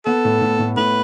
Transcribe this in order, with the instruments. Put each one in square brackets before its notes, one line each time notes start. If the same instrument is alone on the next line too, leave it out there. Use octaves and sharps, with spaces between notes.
[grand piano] B3 [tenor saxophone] A4
[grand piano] A2
A2
A2
[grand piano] A2 [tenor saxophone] B4